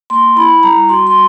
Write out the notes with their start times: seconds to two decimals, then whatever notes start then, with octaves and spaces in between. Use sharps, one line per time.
0.10 A#3 C6
0.36 E4 B5
0.63 G3 A#5
0.89 F#4 C6
1.07 C6